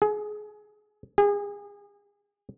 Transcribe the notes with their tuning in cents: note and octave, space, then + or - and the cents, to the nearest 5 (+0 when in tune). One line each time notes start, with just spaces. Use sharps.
G#4 +25
G#4 -30